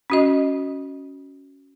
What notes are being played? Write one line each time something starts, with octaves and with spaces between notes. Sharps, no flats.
C#4 F#4 D#5